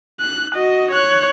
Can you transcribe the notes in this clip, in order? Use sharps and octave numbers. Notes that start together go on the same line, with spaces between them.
F#6
F#4 D#5
C#5 F#6